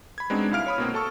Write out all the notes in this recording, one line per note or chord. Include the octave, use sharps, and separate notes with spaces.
B5 G#6
G#3 B3 C4 D4 D#4 F#4
C2 E4 F5 F6 D7
C#5 B5 D#6
B2 A#3 C4
A4 A5 C#6 E6